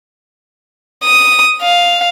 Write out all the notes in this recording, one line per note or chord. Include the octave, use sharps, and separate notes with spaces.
D#6
F5